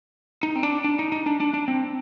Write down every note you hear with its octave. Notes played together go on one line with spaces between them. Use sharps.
D#4
C4
D4
D4
D#4
D#4
D4
D4
D4
C4